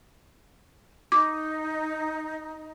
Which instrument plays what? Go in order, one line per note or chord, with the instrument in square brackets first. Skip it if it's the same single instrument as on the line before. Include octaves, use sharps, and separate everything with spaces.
[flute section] D#4 [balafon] D6